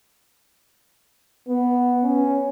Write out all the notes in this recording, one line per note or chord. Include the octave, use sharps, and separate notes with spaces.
B3
C#4